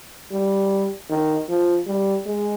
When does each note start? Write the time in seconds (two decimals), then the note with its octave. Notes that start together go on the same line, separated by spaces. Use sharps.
0.32 G3
1.10 D#3
1.49 F3
1.87 G3
2.26 G#3